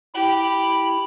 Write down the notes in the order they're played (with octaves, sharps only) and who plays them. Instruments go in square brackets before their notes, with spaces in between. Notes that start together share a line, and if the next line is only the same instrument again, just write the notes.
[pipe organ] E4 B5 [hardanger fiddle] G4